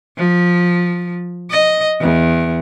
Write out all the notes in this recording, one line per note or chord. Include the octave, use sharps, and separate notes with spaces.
F3
D#5
E2